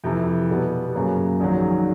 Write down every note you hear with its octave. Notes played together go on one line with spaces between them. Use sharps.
F2 C3 E3
B2 G3 B3
F#2 C#3 F#3 A#3
A#1 G#2 D#3 F#3